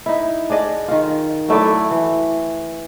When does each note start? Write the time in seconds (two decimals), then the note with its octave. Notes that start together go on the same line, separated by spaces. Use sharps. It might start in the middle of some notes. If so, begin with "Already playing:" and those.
0.06 D#4 E4
0.50 D4 G#4 D5 D#5
0.88 D#3 F4
1.49 F#3 A3 E4 D5
1.91 E3